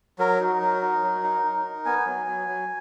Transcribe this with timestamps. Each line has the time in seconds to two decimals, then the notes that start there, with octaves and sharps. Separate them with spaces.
0.19 F#3 A#4
0.41 D#4
0.61 F#3
0.82 D#4
1.02 F#3
1.24 D#4
1.44 D#4
1.65 D#4
1.85 B3 G#5
2.06 F#3
2.26 F#3
2.48 F#3